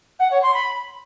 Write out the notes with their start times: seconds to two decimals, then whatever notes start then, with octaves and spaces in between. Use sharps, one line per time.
0.19 F#5
0.30 C#5
0.42 C6
0.53 B5